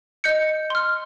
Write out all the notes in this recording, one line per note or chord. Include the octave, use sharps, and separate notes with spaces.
D#5 G6 C#7
C6 F6